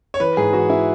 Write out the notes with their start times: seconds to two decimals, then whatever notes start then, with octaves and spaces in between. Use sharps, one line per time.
0.14 C#5
0.20 E3 B4
0.37 G#2 G#4
0.53 E3 F#4
0.70 E4